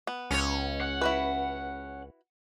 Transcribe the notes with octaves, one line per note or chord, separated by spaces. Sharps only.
B3
C#2 C#4 C#5
F#5
E4 F#4 B4